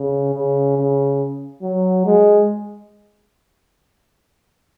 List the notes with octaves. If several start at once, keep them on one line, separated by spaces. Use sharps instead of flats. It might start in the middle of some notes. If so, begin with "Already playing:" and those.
Already playing: C#3
C#3
C#3
F#3
G#3